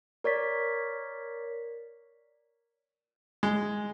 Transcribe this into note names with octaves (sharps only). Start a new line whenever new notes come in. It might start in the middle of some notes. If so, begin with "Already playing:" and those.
A#4 C#5 D5 B6
G#3